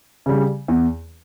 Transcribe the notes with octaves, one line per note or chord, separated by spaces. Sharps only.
C#3 G3
E2